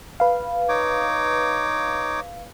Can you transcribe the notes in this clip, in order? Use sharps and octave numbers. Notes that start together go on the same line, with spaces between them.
B4 F5
D#4 C#5 D6